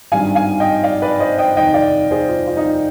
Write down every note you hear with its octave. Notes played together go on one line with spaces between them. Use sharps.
G#1 G2 D#3 G3 F5 G#5
F5 G#5
D#5 G5
D5 F5
B4 D5
C5 D#5
D#5 G5
F1 D#2 D#3 D#5 G5
D5 F5
G#4 C5
F4
F4
D#4
F4